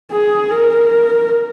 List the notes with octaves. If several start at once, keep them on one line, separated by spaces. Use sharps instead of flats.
G#4
A#4